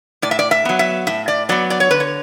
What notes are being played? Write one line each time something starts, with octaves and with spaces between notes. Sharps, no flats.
A2 D5
E5
D5
E5
F#3 B3
E5
A2 E5
D5
F#3 B3 D5
D5
C#5
D3 B4
C#5